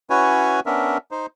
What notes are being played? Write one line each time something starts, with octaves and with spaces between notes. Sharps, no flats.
C#4 E4 F#4 B4 C#5 G#5
B3 C#4 D4 A#4 E5
D#4 C5